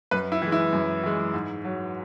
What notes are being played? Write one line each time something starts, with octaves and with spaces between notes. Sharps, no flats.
F#2 B4
E4
E3 G#3
E4
F#2
E3 G#3
G#2
F#3